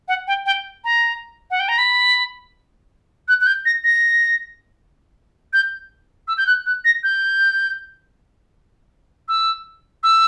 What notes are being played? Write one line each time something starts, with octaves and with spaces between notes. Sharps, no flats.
F#5
G5
G5
A#5
F#5
G5
A#5
B5
F#6
F#6
G6
A#6
A#6
G6
E6
G6
F#6
F#6
A#6
G6
E6
E6